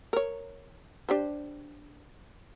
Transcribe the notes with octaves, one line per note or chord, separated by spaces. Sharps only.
A#4 C#5
D4 G4 C5